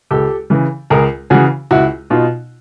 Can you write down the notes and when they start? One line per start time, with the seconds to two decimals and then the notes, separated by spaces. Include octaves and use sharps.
0.11 C#2 G4 A4
0.50 C#3 E3
0.90 C#2 G#4 A#4
1.30 C#3 E3 F#4 G#4
1.71 C#2 E4 F#4
2.10 B2 D#4 F4